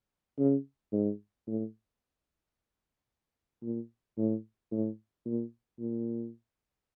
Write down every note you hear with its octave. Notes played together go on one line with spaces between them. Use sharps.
C#3
G#2
A2
A#2
A2
A2
A#2
A#2